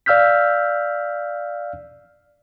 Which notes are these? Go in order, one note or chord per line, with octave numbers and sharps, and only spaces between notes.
D5 F5 E6 F6 G6 B6